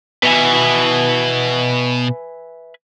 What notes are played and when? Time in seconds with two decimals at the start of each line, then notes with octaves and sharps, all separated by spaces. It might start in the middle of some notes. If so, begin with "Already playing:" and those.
0.23 B2 B4 E5 G#5